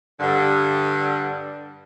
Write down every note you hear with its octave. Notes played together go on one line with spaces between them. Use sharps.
G2 D3